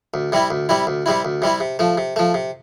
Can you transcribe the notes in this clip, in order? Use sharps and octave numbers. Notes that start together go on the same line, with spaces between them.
D2
C3 G3 C4 E4
D2
C3 G3 C4 E4
D2
C3 G3 C4 E4
D2
C3 G3 C4 E4
C3
F3 A3
C3
F3 A3
C3